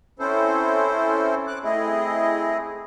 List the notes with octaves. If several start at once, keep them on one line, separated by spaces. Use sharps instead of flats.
C4 C#4 E4 A4 C5
D6 F#6
A3 C4 E4 G#4 D#5